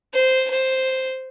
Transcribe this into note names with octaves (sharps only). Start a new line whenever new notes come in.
C5
C5